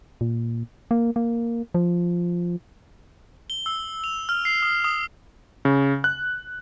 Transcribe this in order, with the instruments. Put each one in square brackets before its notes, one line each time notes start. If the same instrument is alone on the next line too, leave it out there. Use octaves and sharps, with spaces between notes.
[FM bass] A#2
A#3
A#3
F3
[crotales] G7
E6
F7
F6
C7
D#6
D#6
[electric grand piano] C#3
F#6